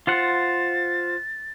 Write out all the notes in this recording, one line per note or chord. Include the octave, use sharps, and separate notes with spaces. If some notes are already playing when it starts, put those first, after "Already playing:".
F4 C5 F#5 A6